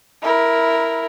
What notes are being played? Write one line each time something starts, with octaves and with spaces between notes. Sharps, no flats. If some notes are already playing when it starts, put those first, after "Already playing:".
E4 A#4